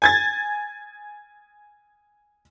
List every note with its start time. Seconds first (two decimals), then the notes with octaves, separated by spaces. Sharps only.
0.02 G#5 G#6 A6